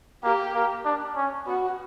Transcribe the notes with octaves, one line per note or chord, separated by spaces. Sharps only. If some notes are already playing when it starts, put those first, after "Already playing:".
A#3 G4
A#3
D4
C#4
B3 F#4